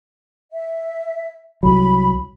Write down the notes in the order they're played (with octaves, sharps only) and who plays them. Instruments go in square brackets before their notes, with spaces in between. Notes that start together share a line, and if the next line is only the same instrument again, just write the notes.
[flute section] E5
[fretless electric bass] C2 F#3 [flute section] B5